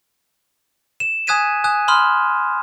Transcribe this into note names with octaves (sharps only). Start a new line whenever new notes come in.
E7
G#5 D#6 F#6 G#6 B6 D#7
G#5 D#6 F#6
B5 C6 D#6 F6